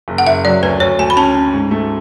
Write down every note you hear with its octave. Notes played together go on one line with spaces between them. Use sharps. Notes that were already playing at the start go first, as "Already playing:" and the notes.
F#1
F#5
F#1 E5
F#3 D5
D2 B4
D2 C#5
D2 G#5
B5
C#4 A5
C#4
G#2
A3